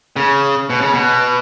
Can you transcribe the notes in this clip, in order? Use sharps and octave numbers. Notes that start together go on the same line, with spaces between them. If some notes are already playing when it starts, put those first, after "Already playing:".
C#3
B2
C#3
B2